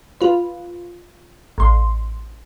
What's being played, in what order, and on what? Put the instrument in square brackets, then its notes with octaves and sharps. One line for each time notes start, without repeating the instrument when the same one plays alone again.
[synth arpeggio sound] F4 B4
A1 C6